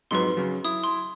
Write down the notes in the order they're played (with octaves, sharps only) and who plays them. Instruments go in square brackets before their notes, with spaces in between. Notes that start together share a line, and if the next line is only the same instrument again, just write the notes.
[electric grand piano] F2 G#2 F#3 [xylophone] B4 C6
[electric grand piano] C#3 F#3
[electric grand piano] E4 [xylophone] D#6
[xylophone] C6